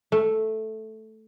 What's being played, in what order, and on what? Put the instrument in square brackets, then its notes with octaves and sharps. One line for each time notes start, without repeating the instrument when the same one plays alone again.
[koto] A3